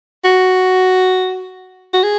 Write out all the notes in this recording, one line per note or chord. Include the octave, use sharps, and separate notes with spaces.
F#4
F#4
G#4